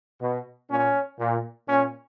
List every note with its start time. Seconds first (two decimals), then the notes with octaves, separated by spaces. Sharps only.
0.21 B2
0.71 A#2 C#4
1.20 A#2
1.69 A#2 C#4